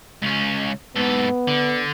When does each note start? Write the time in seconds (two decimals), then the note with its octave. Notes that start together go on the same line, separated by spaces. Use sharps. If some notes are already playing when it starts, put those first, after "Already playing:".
0.22 C#2 C#4
0.96 G#2 B3 A4
1.48 D3